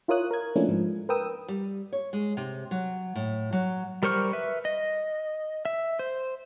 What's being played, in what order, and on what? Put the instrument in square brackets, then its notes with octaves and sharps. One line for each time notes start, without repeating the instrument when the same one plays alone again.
[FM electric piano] E4 F4 A#4 C#5 D#6 F#6
A#4 G#6
F3 A3 A#3 C#4 D4 E4
G#2 F3
A#4 B4 G5 D#6 E6
[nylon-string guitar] G3
C#5
G#3
C3
F#3
A2
F#3
[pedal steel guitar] G3 A#4 C5 C#6 F6
B4 E5
D#5
E5
C5